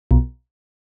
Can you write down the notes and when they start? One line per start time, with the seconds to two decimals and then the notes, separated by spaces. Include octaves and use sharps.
0.11 B1 B2